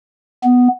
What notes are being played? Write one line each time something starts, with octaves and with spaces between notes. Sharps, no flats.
B3